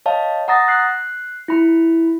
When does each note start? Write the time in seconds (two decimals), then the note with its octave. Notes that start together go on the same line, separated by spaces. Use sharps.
0.06 C#5 D#5 F5 A5
0.48 F#5 A#5 D#6 A6 A#6
0.68 F#6 C7
1.48 E4 B5